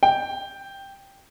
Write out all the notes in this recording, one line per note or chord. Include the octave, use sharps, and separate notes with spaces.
G5